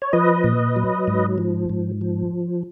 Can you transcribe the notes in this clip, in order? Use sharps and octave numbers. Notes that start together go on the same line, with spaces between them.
C#5
F3 B4 D#5
A#2
F#3
G#2
F3
G#2
F3